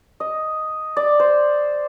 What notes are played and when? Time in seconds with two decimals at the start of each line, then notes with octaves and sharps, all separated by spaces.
0.20 D#5
0.97 D5
1.20 C5